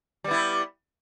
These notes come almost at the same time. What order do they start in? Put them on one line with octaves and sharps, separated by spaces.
G3 B3 E4